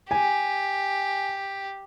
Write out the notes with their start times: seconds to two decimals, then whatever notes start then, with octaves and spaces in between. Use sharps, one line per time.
0.11 G4 G#5